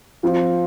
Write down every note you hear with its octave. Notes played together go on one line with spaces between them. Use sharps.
F3 C4 F4